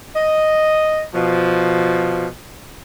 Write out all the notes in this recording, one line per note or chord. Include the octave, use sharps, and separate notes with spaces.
D#5
B2 F3